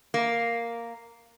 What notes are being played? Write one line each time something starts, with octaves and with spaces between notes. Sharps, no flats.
A#3